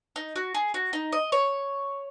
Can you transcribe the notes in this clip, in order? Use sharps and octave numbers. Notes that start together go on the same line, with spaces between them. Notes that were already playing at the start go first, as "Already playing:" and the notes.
D#4
F#4
G#4
F#4
D#4
D#5
C#5